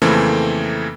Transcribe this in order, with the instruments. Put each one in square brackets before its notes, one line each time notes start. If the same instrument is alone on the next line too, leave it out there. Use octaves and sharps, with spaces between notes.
[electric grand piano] F2 C#3 E3 A3 A#3 C4